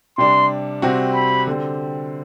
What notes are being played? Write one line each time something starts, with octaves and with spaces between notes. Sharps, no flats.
C3 G3 D4 C6
C3 G3 C4 F#4
B5
D3 G3 C4